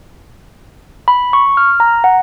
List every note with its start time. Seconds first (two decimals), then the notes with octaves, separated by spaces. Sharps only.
1.08 B5
1.33 C#6
1.57 F6
1.80 A#5
2.04 F#5